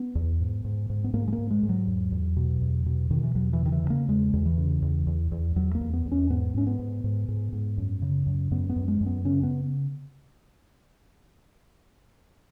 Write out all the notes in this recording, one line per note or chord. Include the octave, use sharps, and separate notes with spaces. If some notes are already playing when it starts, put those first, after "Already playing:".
Already playing: B3
E2
G#2
G#2
G#2
B3
G#2 A#3
G#3
A#3
G#2
G#3
G#2
F#3
E2
E2
B2
E2
B2
B2 D#3
E3
E2 F#3
E3
C#3
D#3
E3
C#3
A#3
E2 G#3
E2
E3
C#3
E2
E2
E2
E2 F#3
A#3
E2
B3
E2
C#4
G#2 B3
G#2 C#4
B3
G#2
G#2
G#2
G#2
F#2
C#3
F#2
F#2 B3
B3
F#2
G#3
F#2
B3
C#3 C#4
B3